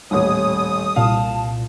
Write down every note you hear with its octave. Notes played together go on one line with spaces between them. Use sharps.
D#1 A1 C#5 D#6
C2 A#2 F5 A5